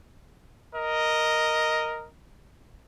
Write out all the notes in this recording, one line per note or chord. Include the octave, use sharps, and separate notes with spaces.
A#4 D#5